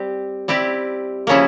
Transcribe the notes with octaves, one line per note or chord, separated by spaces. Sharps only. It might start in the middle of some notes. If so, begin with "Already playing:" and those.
Already playing: G3 C4 G4
G3 C4 E4 G4
C#3 F3 A#3 C#4 E4